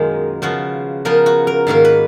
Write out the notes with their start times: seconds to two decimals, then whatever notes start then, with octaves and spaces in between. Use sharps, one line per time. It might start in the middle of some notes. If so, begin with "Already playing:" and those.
Already playing: F#2 B2 D#3 G#3 C#4 D#4 F4
0.42 C#3 F3 B3 F#4
1.05 C#3 F3 B3 A#4
1.26 F#4
1.47 A#4
1.67 G#2 D#3 A#3 A#4
1.85 B4